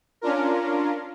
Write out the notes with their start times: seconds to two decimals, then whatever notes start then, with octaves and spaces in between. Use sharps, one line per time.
0.21 C#4 D4 F4 A#4